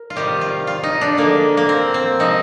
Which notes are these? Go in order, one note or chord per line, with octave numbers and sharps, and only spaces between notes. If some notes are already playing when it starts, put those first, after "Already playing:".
Already playing: A#4
F4
C3 D#3 G3 G4
F4
F4
D#4
D4
D3 F3 G#3 A#3
A#3
C4
C4
C3 F3 G#3 D#4